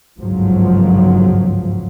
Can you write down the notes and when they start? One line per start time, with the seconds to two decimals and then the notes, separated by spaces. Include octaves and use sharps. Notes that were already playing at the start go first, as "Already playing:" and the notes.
0.20 G1 C#2 G#2 F3 F#3